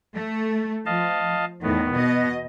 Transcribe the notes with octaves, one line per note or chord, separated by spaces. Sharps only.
A3
F3 D#5 F5 A5
E2 A2 D#3 B3
B2 D#5